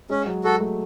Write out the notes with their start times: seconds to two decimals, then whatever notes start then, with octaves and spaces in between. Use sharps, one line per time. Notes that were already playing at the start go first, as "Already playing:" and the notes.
0.10 G#3 C#4
0.26 F#3
0.44 G#3 F#4 A4
0.60 A3